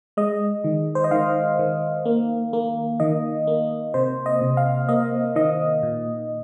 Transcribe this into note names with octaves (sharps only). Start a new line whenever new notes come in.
G#3 D#5
D#3
C5
D#5
D#3 F5
D#3
A#3
A#3
D#3 D#5
A#3
C3 C5
D#5
C3
F5
A#3 D#5
D#3 D#5
A#2